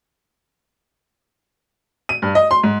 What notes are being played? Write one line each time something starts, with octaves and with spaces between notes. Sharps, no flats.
D#7
G2
D#5
C6
G#2